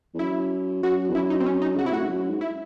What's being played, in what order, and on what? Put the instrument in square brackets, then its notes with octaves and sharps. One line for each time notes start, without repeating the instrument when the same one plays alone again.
[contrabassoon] E2
[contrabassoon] F#2 [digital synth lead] E4
[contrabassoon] F#2 [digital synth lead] F#4
[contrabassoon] E2
[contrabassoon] F#2 [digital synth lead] E4
[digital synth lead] D#4
C4
C#4
D#4
[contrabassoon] C#3 [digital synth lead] F#4
[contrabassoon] C3 [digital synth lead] E4
[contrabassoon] A2 [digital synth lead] F#4
[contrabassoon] G#2
F#2
G#2
[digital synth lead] E4